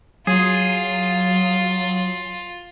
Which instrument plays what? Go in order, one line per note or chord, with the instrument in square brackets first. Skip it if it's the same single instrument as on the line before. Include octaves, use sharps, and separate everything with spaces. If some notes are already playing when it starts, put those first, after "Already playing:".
[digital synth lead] F#3 [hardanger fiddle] F4 [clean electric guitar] G#4